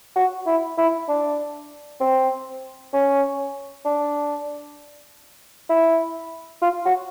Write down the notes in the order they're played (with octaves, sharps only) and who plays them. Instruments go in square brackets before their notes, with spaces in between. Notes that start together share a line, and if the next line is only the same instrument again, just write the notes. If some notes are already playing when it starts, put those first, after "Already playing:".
[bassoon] F#4
E4
E4
D4
C4
C#4
D4
E4
F4
F#4